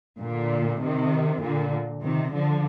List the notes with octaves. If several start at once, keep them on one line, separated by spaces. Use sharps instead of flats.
A#2 D3
C3 D#3
A#2 D3
C3 D#3
D3 F3